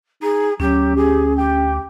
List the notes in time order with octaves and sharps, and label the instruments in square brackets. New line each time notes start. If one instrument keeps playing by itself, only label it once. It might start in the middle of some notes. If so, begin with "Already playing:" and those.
[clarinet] D#4 [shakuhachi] G#4
[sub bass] D2 [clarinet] F#3 [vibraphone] C#4 [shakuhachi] G4
[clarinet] G4 [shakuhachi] G#4
[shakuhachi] G4 [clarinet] G5